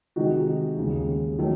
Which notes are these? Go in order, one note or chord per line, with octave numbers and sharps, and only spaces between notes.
C3 D#3 G#3 D#4 F#4
D#2 C#3 G#3
D#3 F#3 A3